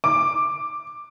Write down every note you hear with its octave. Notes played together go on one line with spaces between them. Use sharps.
D6